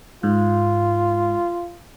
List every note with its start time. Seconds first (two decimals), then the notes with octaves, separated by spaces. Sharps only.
0.23 G#2 F4